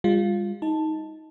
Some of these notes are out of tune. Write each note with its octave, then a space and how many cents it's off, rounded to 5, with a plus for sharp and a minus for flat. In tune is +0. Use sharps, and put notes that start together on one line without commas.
G3 +45 F4 +0
D#4 +15 A5 +0